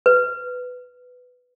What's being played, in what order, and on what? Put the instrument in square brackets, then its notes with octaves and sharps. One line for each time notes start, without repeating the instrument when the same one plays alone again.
[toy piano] B4